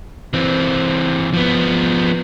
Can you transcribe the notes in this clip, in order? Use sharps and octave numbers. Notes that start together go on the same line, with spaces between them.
E3 C4
F3 B3